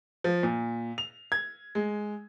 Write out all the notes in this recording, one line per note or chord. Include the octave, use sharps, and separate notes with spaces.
F3
A#2
F7
G#6
G#3